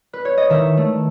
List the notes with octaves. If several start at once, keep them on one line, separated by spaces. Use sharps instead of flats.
B4
C#5
D#5
D#3 E5
A3